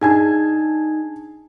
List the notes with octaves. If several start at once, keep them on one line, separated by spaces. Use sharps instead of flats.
D4 D#4 G#4 G#5 A5 G#6